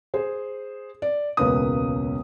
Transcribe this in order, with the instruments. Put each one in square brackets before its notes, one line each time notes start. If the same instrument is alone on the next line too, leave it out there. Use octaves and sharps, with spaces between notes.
[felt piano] G#4 C5
D5
E1 C#2 A#3 C#4 B4 D#6